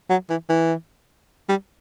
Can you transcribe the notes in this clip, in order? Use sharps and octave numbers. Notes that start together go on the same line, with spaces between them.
F#3
E3
E3
G3